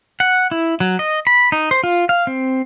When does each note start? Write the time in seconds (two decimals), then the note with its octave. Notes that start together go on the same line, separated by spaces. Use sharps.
0.20 F#5
0.51 E4
0.80 F#3
0.99 D#5
1.27 B5
1.52 D#4
1.71 C5
1.84 F4
2.09 F5
2.27 C4